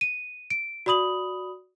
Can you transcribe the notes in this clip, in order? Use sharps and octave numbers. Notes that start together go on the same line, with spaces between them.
D#7
D7
F#4 D5 B5 D#6 F#7